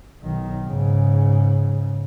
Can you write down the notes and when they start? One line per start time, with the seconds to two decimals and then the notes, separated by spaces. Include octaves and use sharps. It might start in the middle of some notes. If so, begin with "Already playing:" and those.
0.23 B1 D#3
0.64 G#2 C#3